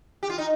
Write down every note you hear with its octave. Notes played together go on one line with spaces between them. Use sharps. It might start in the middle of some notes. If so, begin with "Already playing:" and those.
G4
F4
D#4